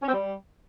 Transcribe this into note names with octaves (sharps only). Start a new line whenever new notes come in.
C#4
C4
G3